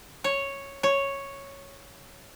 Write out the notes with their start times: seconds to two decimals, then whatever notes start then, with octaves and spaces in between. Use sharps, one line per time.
0.24 C#5
0.83 C#5